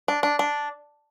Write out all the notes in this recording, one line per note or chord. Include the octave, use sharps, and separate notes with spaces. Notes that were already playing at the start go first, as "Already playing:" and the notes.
D4
D4
D4